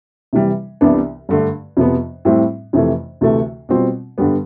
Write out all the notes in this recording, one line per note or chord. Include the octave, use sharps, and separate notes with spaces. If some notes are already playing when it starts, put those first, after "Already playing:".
C3 E3 G3
C2 C3 E3 B3 D4
G2 D3 A3
F2 C3 F3 B3
A2 G3 C4 E4
F2 C3 E3 A3
D2 C3 E3 A3
B2 G3 C4 F4
G2 D3 G3 B3